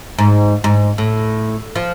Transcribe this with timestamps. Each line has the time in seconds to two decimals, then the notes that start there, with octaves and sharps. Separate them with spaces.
0.19 G#2
0.64 G#2
0.98 A2
1.76 F3